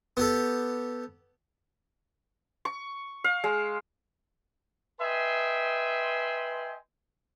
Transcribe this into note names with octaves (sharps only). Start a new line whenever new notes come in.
B3 G4 A4
C#6
F5
G#3
B4 D#5 E5 G5 G#5 C6